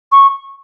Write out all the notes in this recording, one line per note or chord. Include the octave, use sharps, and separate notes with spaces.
C#6